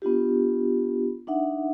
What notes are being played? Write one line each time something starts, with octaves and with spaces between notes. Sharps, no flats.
B3 D4 F4 G4
D4 D#4 E5 F#5